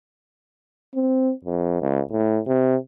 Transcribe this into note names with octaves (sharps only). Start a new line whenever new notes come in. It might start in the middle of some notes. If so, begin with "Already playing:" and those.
C4
F2
C#2
A2
C3